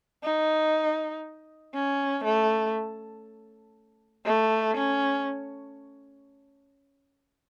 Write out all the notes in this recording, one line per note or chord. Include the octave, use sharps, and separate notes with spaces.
D#4
C#4
A3
A3
C#4